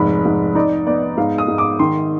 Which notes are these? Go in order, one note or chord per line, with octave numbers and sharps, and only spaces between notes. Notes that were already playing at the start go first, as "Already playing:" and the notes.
Already playing: F1 G#2 B5
G#2
D#4 D5
B3 D5
G#2 F5
D#6
G#2
D6
D#3 C6